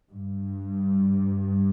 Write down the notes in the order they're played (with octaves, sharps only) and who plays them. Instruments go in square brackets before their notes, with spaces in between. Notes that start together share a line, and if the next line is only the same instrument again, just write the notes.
[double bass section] G2